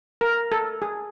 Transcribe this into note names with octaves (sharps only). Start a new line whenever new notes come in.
A#4
A4
G#4